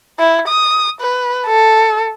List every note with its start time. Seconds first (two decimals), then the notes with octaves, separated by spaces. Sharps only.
0.19 E4
0.48 D#6
1.01 B4
1.47 A4